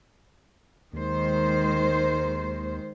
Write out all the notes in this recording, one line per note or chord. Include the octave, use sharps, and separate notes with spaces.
D#2 D#3 G#3 C5